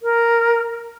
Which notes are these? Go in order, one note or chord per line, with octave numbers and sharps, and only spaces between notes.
A#4